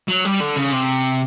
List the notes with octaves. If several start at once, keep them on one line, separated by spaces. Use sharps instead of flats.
F#3
G3
D3
C#3
C3